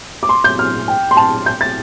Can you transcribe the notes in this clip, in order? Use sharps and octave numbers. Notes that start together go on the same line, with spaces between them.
D6
C6
G6
F6
G5
C6
A5
G6
A6